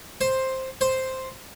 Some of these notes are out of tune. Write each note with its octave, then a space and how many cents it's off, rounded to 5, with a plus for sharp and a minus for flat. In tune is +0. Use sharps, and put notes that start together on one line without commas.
C5 +5
C5 +0